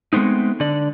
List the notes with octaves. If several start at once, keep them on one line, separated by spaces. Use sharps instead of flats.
G#3 A3 B3 C4 D#4
D3 D5